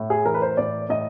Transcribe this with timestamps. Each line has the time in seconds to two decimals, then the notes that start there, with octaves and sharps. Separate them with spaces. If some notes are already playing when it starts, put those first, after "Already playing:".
Already playing: A2
0.10 G#4
0.26 E3 A#4
0.34 B4
0.42 C5
0.57 A2 D5
0.89 A2 D#5